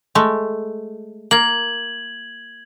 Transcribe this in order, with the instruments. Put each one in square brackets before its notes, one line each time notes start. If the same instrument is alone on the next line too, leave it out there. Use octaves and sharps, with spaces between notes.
[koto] G#3 A3
[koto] A#3 [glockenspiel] G#6 F#7